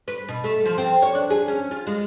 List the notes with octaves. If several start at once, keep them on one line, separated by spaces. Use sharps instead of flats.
B4
B2
A3
F3
C4
C#5
D4
G#4
C#4
F4
G#3